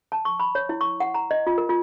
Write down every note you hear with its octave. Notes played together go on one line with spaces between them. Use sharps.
A5
C#6
B5
C#5
E4
C#6
F#5
A#5
D#5
F4
A#4
F4